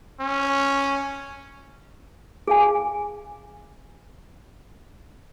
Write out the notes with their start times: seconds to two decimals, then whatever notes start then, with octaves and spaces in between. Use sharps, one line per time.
0.21 C#4
2.48 G#4 F5 G#5